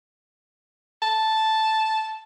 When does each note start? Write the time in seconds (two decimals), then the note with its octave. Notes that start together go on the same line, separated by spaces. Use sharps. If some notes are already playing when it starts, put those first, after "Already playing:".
1.02 A5